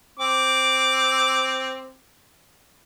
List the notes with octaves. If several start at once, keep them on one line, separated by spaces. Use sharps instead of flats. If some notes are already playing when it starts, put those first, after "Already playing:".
C4 D6